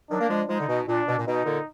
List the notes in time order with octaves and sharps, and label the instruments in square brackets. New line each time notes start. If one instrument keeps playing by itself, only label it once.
[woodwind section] D#3 F#3 [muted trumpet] D4
[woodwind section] A#3
F3 G#3
[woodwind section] F3 G#3 [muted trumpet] D#4
[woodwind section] D3
B2
[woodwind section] A#2 [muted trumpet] D4
[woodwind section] B2
A#2
[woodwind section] B2 [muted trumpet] D#4
[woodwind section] A#2 D3